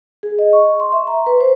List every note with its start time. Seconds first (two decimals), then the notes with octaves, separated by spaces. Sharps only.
0.23 G#4
0.39 D#5
0.53 C#6
0.80 C6
0.92 E5
1.07 A#5
1.26 B4
1.40 C5